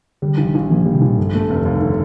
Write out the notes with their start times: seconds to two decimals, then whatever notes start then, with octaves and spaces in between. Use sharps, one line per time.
0.22 D3 G3
0.37 A#1
0.45 D#3
0.55 A#1
0.70 A#2 F3
0.82 D#3 G3
0.94 C3
1.01 A#1
1.06 A#2
1.18 G2 D3
1.34 A3
1.50 F1
1.65 D#2
1.82 D3